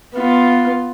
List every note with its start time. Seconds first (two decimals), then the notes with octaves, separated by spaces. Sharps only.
0.14 B3 F4